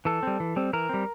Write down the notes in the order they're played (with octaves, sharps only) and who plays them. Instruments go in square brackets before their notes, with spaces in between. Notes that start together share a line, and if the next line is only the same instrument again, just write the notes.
[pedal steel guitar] E3 A4
G3 C4
E3
G3 C4
E3 A#4
G3 C4